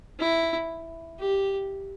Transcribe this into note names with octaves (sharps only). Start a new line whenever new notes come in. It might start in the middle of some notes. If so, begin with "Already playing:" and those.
E4
G4